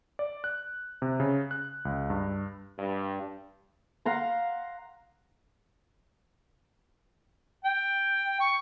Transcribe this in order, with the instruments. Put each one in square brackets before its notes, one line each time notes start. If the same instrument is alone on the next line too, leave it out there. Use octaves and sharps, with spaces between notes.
[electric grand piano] D5
F#6
C3
C#3
F#6
C#2
G2
[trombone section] G2
[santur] F5 F#5 A#5 C6
[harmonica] G5
C#6